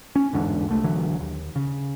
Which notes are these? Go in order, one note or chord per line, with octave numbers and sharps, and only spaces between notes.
C#4
G1 E2 G#2 D3
C2 A3
B1 D3 E3 F#3
D#2
C#3